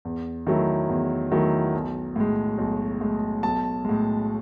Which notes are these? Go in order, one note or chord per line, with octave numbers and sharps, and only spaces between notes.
E2
D#3 F#3 A3 E4
E2
D#3 F#3 A3 E4
B1
A2 G#3
B1
A2 G#3
B1 A5
A2 G#3